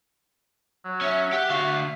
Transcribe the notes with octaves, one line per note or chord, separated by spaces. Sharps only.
F#3
C#4 E5
G4 F#5
D2 F#4 F5